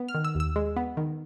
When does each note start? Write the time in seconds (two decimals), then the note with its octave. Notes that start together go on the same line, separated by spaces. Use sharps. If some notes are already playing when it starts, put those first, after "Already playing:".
Already playing: B3
0.08 F6
0.14 D#3
0.25 E6
0.35 D#2
0.40 E6
0.56 G#3
0.77 B3
0.97 D#3